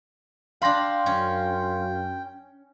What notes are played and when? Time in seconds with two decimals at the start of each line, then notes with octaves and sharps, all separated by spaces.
0.62 D4 F5 G5 B5 C6 A#6
1.06 F#2 C#4